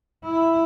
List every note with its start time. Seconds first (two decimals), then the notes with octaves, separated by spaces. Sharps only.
0.24 E4